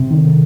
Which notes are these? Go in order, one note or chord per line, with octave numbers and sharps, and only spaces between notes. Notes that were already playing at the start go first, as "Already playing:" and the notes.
Already playing: C3
D#3